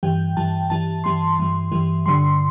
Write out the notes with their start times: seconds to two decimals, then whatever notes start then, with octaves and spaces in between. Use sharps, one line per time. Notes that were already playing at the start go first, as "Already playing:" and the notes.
0.03 G2 E3 G3 G5
0.37 G2 E3 G3 A5
0.70 G2 E3 G3 A5
1.04 G2 E3 G3 C6
1.39 G2 E3 G3
1.72 G2 E3 G3
2.06 G2 D3 G3 C6